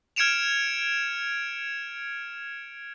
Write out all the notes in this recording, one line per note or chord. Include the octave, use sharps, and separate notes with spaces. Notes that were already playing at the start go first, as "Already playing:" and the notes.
F6 G#6 C#7 D7 E7 F7